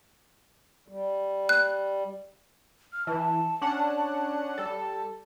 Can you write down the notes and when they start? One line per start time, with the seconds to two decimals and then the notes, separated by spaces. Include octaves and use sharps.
0.88 G3
1.49 F#6
2.93 F6
3.07 E3 A5
3.61 C#4 D4 F#5
4.58 G3 A4